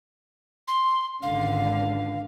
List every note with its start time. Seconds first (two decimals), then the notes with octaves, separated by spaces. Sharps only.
0.68 C6
1.22 G#1 C#2 D3 F5